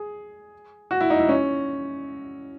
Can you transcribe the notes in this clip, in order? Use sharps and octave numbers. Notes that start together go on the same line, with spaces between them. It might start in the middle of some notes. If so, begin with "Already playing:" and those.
Already playing: G#4
F#4
E4
D#4
E4
C#4